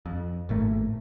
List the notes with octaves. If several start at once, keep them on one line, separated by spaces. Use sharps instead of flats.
F2
G#1 A2 A3 A#3